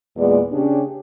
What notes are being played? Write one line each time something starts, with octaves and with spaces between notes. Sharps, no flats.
E2 A#2 G#3 B3 D5
C#3 C#4 D4 G4